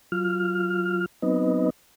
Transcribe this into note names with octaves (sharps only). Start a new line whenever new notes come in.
F#3 F4 F6
F#3 B3 C4 D#4 B4 D#5